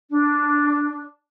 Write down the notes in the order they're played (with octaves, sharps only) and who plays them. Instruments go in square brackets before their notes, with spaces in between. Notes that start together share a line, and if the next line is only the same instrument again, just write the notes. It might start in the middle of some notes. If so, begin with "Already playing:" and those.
[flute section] D4